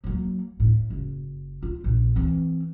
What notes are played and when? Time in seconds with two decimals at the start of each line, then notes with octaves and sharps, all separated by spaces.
0.04 F#3 A#3
0.60 A2
0.90 F#1
1.62 F4
1.84 A#1
2.16 E3 C4